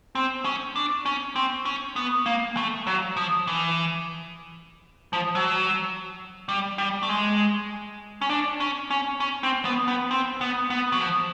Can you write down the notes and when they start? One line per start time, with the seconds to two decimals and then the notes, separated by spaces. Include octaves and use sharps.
0.15 C4
0.45 C#4
0.76 D4
1.06 C#4
1.36 C4
1.65 C#4
1.96 B3
2.26 A#3
2.57 A3
2.87 F#3
3.17 F3
3.47 E3
5.13 F3
5.35 F#3
6.49 G3
6.78 G3
7.03 A3
7.09 G#3
8.22 C#4
8.29 D4
8.60 C#4
8.90 C#4
9.20 C#4
9.43 C4
9.65 B3
9.88 B3
10.11 C4
10.41 B3
10.70 B3
10.92 F#3
11.00 F3